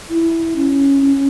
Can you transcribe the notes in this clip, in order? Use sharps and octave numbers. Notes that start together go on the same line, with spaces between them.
E4
C#4
C#4